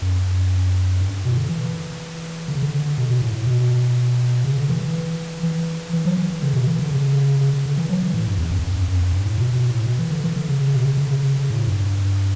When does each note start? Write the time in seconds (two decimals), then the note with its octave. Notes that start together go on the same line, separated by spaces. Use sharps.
0.02 F#2
1.00 G2
1.25 B2
1.36 D3
1.49 E3
2.48 D3
2.55 C#3
2.62 D3
2.98 B2
3.09 B2
3.21 A2
3.33 A2
3.47 B2
4.45 C#3
4.57 D3
4.69 E3
4.81 E3
5.43 E3
5.93 E3
6.05 F#3
6.17 E3
6.30 E3
6.42 C#3
6.54 B2
6.67 E3
6.79 D3
6.91 C#3
7.41 C#3
7.53 C#3
7.65 D3
7.77 E3
7.89 F#3
8.02 E3
8.14 A2
8.27 G2
8.38 E2
8.51 F#2
8.59 E2
8.64 F#2
8.75 F#2
8.88 F#2
9.01 F#2
9.13 G2
9.25 A2
9.38 B2
9.53 B2
9.70 A2
9.86 B2
9.98 E3
10.11 D3
10.24 E3
10.36 D3
10.48 C#3
10.61 C#3
10.73 B2
10.85 C#3
10.97 D3
11.10 C#3
11.22 C#3
11.35 C#3
11.50 A2
11.67 G2